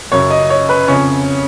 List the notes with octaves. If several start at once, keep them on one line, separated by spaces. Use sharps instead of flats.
F#2 C#3 C#5
D#5
C#5
B4
F2 C#3 C#4